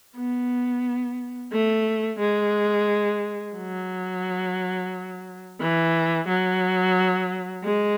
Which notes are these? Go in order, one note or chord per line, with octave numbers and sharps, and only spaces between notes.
B3
A3
G#3
F#3
E3
F#3
G#3